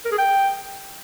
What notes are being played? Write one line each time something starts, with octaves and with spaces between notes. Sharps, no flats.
A#4
G#4
G5